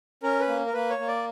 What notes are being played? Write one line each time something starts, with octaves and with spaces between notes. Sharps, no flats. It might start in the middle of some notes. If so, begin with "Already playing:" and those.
C#4 A#4
B4
A#3
A#4
A#3 B4
C#5
A#3
D5